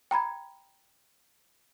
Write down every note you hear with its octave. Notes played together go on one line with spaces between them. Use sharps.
G5 A#5 B5 G#6